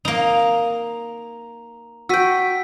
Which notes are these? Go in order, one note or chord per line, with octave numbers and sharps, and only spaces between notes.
A#3 D#4 A#5 F7
F#4 G5 E6 B6 D#7